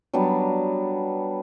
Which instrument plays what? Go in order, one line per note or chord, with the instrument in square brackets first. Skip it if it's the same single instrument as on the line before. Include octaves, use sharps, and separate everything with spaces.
[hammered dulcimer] F#3 G3 B3 D4